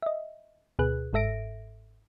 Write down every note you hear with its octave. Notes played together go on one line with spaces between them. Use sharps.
D#5 E5
D2 B2 G#4 B4 F#6
G1 G#2 A4 E5 A#6 D7